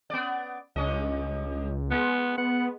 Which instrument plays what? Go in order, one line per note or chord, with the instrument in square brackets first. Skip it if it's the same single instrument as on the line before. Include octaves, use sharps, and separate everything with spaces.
[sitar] B3 D5
[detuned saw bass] C#2 [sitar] G2 C#4 D#5
[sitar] G#3 [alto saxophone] B3
[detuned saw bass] B3 [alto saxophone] F#5